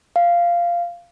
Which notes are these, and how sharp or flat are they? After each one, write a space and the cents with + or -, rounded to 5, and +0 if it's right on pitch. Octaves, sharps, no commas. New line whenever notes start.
F5 -10